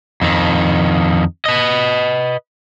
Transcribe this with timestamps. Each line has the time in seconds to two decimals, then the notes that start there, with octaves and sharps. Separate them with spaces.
0.22 F2 D#3
1.45 B4 D#5